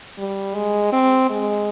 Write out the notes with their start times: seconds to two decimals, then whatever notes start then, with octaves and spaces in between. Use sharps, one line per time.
0.18 G3
0.55 G#3
0.92 C4
1.30 G#3